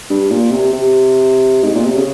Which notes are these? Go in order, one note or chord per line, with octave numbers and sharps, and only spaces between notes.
G2
A#2
C3
C3
G#2
A#2
C3
C#3